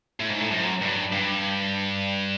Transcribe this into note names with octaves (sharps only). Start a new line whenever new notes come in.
A2
G#2
A2
F#2
G2
G2